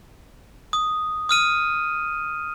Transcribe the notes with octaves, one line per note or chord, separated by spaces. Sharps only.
D#6
D#6 F6 D#7